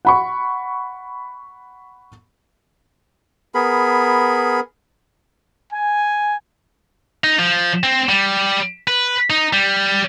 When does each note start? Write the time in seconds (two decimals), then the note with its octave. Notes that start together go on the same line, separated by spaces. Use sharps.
0.05 F#5 B5 C#6
3.54 B3 G#4 A#4 B5
5.72 G#5
7.24 D#4
7.39 F3
7.83 C4
8.09 G3
8.87 B4
9.30 D#4
9.53 G3